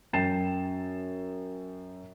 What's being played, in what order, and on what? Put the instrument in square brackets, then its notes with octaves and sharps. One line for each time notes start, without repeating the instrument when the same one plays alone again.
[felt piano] F#2 G5 A6 C7 E7